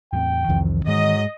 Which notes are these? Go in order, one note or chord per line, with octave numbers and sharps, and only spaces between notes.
E2 A2 C4 G5
C2 F2 D#3 E3 C4
G#2 F#3 G#3 D#5